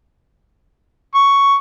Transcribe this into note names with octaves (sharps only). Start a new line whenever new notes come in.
C#6